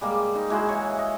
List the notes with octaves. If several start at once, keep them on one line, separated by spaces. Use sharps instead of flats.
G3 G#3 A#3
D#4
G#3 E4 F#4 C5
E3 C#5
D#5